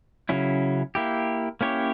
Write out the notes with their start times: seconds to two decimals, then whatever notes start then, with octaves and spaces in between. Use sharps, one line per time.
0.29 C#3 F#3 C#4 E4
0.95 A#3 E4 G4
1.61 A#3 C#4 E4 G4 C#5